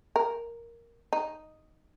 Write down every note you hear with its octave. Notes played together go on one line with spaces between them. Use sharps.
A#4
D#4